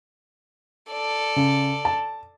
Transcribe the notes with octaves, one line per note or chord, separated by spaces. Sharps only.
A4 D5
C#3
A5